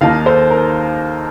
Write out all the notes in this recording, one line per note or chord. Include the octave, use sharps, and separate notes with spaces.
D#2 D#3 A#3 D#4 F5 A5
A4 C5
A#4